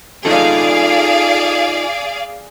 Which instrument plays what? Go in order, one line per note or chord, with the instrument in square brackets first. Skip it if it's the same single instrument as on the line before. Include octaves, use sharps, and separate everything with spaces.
[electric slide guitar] D#4 F4 A4 [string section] G#4 D5 F5